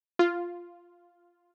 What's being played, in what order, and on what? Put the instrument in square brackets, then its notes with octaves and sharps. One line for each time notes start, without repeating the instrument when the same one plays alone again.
[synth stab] F4